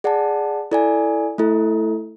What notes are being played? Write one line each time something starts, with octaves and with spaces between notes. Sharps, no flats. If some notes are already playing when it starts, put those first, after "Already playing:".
G#4 D5 F#5 A5
E4 A4 D5 G#5
A3 E4 A4